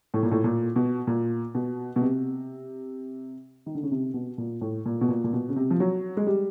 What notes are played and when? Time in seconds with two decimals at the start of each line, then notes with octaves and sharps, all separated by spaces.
0.14 A2
0.23 A#2
0.31 A2
0.44 A#2
0.76 B2
1.07 A#2
1.54 B2
1.96 B2
2.01 C3
3.66 D#3
3.75 D3
3.83 C#3
3.91 C3
4.14 B2
4.38 A#2
4.61 A2
4.85 A#2
5.01 B2
5.08 A#2
5.24 A#2
5.33 B2
5.49 C#3
5.56 C3
5.70 F3
5.80 F#3
6.17 G#3
6.27 G3